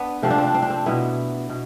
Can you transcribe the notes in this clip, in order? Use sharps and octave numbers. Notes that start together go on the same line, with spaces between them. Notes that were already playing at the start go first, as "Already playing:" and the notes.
Already playing: B3 D4
C3 F3 A3 C4
D4
C4
D4
C4
D4
C4
B2 B3 E4
B2